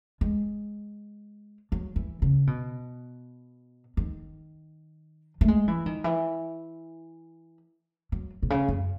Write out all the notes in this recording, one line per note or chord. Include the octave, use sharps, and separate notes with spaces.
G#3
F#3
E3
C#3
B2
D#3
A3
G#3
E3
D#3
E3
F#3
B2
C#3
F#2